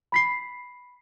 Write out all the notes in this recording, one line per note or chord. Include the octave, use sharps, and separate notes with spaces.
B5 B6 C7